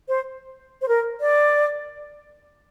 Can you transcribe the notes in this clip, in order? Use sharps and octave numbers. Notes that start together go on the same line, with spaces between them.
C5
C5
A#4
D5